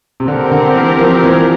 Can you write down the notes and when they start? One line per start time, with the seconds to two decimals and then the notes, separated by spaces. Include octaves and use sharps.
0.20 C3
0.28 D3 C4 G4 A#4
0.52 D3
0.76 E3
1.00 F3
1.24 E3